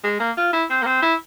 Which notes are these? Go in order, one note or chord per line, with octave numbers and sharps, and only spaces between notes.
G#3
A#3
F4
E4
C4
A#3
C4
E4